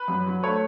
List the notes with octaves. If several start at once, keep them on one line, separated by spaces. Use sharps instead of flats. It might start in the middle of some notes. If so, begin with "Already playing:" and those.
Already playing: B4
F#2
F#3
A3 C#5